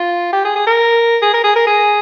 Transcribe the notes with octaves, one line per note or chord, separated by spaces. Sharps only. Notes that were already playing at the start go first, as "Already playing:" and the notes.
Already playing: F4
G4
G#4
G#4
A#4
G#4
A#4
G#4
A#4
G#4